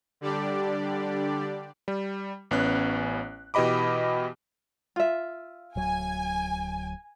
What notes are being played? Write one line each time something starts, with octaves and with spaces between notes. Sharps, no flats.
D3 G3 D4 G4 D5
G3
A1 B3 C#4 F#6
B2 E3 G4 D#5 B5 D6
F4 E5
D1 F#3 G#5